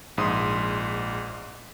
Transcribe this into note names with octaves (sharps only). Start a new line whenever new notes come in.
A#1 G#2 C6 D#6